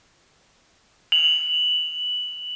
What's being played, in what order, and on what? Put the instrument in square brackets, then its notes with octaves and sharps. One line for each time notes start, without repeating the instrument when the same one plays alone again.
[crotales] F7 F#7